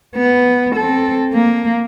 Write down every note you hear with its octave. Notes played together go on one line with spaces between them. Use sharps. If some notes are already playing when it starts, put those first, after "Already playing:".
B3
C4 A4
A#3